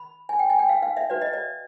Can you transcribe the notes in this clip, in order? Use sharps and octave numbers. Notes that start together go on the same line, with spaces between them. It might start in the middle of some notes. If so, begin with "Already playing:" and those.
Already playing: B5
G#5
G5
G#5
G5
F5
F5
E5
F#4 B4 D5
D#5
D5